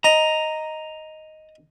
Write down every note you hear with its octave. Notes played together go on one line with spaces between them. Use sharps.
D#5 A#5